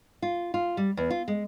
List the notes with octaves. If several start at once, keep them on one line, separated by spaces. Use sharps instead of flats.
F4
F4
G3
E2
F4
G#3